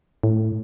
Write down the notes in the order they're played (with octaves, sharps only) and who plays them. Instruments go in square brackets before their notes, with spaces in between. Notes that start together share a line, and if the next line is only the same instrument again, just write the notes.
[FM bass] A2